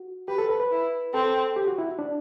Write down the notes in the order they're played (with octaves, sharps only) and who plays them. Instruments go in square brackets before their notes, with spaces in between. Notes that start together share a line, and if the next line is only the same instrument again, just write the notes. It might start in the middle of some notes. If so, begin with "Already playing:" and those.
Already playing: [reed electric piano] F#4
[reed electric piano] G4 [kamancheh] B4
[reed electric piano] A4
B4
B4
[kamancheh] E4
[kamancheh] C4 [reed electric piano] A4
[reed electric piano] G4
F#4
E4
D4